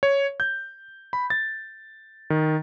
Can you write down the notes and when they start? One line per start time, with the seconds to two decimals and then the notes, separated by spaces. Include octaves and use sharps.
0.03 C#5
0.40 G6
1.13 B5
1.30 A6
2.30 D#3